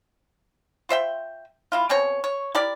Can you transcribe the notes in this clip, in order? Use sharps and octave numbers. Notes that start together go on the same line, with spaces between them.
F4 C5 E5 G5
A#3 E4 F4
B2 C4 C#4 C#5
C#5
E4 G4 A#4 D5